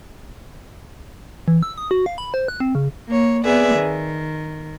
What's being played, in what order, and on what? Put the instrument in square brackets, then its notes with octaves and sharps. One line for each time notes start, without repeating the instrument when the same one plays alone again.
[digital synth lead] E3
E6
D#6
F#4
F5
B5
C5
F#6
C4
C#3
[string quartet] A#3 C#5
B3 C4 G#4 B4 D5 E5
D#3